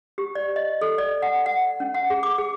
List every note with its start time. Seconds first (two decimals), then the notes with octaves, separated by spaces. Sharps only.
0.18 G4
0.35 D5
0.56 D#5
0.81 A4
0.98 D5
1.22 F#5
1.46 F#5
1.80 C#4
1.94 F#5
2.10 G#4
2.23 D6
2.38 G#4